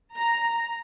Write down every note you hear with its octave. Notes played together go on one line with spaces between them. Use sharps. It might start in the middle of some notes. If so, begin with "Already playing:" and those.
A#5